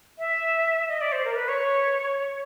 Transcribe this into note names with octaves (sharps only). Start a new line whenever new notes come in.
E5
D#5
D5
C5
A#4
B4
C#5